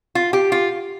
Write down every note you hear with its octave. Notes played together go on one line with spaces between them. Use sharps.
F4
G4
F4